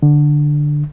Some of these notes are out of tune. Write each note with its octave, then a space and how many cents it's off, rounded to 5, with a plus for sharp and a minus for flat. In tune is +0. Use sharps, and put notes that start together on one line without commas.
D3 +5